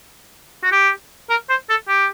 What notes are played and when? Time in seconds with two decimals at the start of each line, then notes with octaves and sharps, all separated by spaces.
0.63 F#4
0.72 G4
1.30 A#4
1.50 C5
1.70 A4
1.88 G4